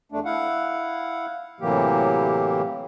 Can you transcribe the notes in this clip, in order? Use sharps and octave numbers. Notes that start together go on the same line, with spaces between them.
E2 A3 D4
E4 F5 F#5
A2 C3 E3 F#3 A#3 G4